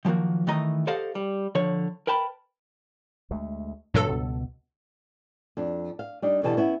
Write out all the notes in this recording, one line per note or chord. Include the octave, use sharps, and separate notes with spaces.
D#3 F3 F#3 A#3 F#4
D#3 E3 A3 D#5 A#5
G4 A4 C5 D#5 F5 F#5
G3
D3 F3 C#5
A#4 B4 G5 A5 B5
D2 G#3 A3
G2 A#2 E3 F#3 A3 A4
C#2 B2
F2 D4
F5
G3 D4 D#4
B2 D3 E3 G4 A5
B3 C#4 E4